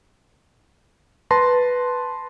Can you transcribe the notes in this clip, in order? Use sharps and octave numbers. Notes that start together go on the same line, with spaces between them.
B4 A5 C6 A#6